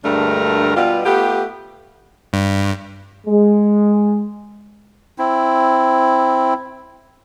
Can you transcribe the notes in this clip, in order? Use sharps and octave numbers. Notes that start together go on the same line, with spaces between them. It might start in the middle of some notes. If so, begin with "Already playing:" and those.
D2 G2 G#3 A3 D4 A#4
B2 G3 F4
A3 B3 F4 G4
G2
G#3
C4 E4